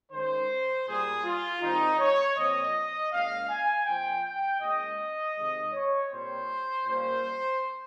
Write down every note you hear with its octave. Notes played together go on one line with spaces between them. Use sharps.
D#3 G#3 C#4 C5
A#2 G3 A#3 G#4
F4
D#3 G3 C4 D#4
C#5
A#2 F3 C4 D#5
A#2 G#3 C#4 F5
G#5
A#2 F3 C4 G5
G5
A#2 G#3 C#4 D#5
C3 D#3 G#3
C#5
A#2 G3 C4 C5
A#2 G3 A#3 C#4 C5